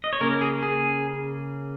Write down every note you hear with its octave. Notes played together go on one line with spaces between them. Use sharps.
D#5
C#5
C#3 A#3 C#4 A#4
G#4
G#4